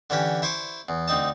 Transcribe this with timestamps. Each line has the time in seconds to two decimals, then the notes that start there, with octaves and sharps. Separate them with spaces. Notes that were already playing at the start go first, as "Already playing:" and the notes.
0.10 D3 E3 C#4 G4
0.42 E4 C5 C#6 D6
0.89 E2
1.08 D2 C4 D#4 A5